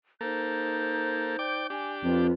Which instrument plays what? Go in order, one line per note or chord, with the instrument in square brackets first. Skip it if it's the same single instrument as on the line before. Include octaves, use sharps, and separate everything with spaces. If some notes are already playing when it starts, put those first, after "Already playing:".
[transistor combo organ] A#3 A4 [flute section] D#4 C5 G6
[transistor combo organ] D5 G5 D6
[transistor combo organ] D4 G4 [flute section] G#5
[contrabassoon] F2 [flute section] F4 B4